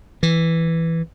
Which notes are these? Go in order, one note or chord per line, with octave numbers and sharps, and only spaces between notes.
E3